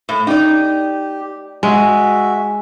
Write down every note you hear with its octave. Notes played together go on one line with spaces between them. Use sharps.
A2
D#4 G4 D5
G#3 F#4 E5 G#5